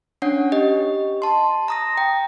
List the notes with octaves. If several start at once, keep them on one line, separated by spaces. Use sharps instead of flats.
C#4 D4 C#5 F#5
G4 D#5
A5 C6
A#5 D#6 A#6
G5